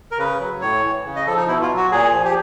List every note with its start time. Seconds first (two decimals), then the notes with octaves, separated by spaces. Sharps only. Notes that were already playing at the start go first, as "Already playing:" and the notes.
0.11 A#4
0.18 C#3 B4
0.40 F#3
0.61 A2 C#5
0.84 E3
1.05 C#3
1.16 D#5
1.27 F3 A4
1.37 D#4
1.48 B2 E4
1.62 F4
1.69 F#3
1.77 F#4
1.92 A#2 G#4
2.12 F3
2.24 G4